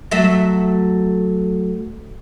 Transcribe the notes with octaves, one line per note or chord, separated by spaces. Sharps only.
F#3 A3 E5